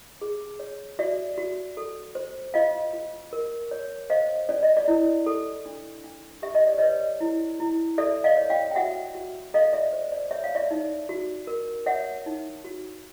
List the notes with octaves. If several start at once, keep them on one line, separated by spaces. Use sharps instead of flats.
G#4
C#5
F#4 D5 E5
F#4
A4
C5
F4 D#5 F5
F4
A#4
C#5
C5 D#5 F5
C#4 D5
D#5
D5
E4
A4
D4
D4
G4 E5
D#5
D5
B4 C#5 D#5
E4
E4
A4 D5 E5
D#5 F5
C#5
F5 G5
G5
F#4 E5 F#5
F#4
A4 D#5 F5
D5 E5
C5
D5
C#5 E5
F5
D5 E5
D#4
F#4
A#4
C#5 E5 F#5
D#4
F#4